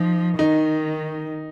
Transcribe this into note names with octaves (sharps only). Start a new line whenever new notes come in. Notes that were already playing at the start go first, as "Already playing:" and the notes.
Already playing: F3 D#4
D#3 D#4